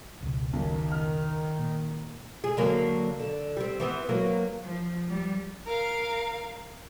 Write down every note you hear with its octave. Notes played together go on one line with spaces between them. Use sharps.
F1 C#2 B2
B1 D#3
F6
A#2
G#4
D3 F#3 A#3
D3
G3 C4
E3 B3 C4
F#3 A#3 B3
F3
G3
A#4 F5